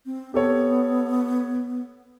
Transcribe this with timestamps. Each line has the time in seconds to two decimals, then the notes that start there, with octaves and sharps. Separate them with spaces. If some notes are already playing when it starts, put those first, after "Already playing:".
0.06 C4
0.34 B3 G4 A4 C#5